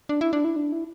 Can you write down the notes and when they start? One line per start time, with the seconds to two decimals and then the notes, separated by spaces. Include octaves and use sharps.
0.09 D4
0.21 E4
0.33 D4
0.45 E4
0.56 D4
0.72 E4